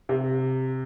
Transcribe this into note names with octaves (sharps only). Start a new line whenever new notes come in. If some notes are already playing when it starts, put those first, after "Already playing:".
C3